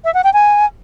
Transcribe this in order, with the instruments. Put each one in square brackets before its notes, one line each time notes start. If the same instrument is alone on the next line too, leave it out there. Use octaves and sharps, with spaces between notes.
[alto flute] E5
F#5
G5
G#5